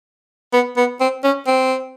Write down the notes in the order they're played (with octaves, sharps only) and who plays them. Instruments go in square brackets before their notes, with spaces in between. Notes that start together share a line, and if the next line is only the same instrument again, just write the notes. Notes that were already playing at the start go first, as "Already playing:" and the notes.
[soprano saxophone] B3
B3
C4
C#4
C4